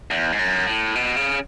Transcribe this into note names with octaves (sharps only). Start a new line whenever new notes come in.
E2
G#2
F#2
A2
B2
C#3